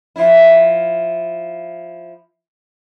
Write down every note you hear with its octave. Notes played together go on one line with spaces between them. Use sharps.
F3 E4